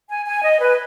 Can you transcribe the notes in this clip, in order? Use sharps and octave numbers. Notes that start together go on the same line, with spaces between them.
G#5
G#5
D#5
B4